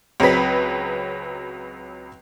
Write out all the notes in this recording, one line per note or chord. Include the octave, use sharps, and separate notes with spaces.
C#2 F#3 C4 G#4 B4 B6